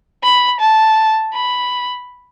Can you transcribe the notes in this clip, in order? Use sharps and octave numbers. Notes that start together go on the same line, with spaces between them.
B5
A5
B5